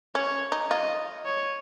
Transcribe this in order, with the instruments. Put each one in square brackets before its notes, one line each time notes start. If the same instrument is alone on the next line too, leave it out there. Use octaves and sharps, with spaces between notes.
[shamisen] C#4 [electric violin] C#5
[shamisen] D#4
[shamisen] F4 [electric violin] D#5
[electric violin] C#5